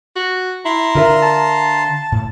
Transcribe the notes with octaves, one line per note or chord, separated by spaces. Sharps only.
F#4
E4 A#5 C6
D3 D4 F4 A#4 E5
A5
A2